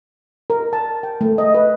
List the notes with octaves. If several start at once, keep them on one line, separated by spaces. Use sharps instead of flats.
A#4
A5
G5
A3
D#5
B4